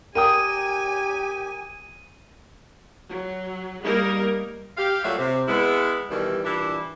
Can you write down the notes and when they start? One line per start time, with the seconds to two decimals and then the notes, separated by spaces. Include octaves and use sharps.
0.15 G4 A#4 G5 G#5 D#6 D#7
3.11 F#3
3.84 G3 A#3 D#4 A#4
4.77 G4 F5
5.04 A#2 F#3 G3 A3 E5 F5
5.18 C3
5.47 G#3 B3 E4
6.10 B2 D#3 E3 G3
6.44 A#2 E3 G3 D4 E4